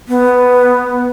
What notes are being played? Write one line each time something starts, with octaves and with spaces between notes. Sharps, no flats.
B3